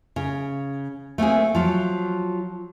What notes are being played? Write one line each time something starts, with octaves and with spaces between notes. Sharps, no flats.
C#3
A3 A#3 C4 G#4
F3 F#3